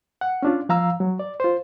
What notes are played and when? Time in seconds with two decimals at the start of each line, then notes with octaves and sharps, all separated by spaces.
0.21 F#5
0.43 C#4 D4 F4
0.69 F3 F5 A#5 E6
1.00 F#3
1.19 D5
1.40 F4 C5